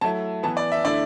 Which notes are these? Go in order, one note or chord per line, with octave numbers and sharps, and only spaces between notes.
F#3 A3 E4 A5
E3 B3 E4 A5
D5
E5
D3 A3 E4 D5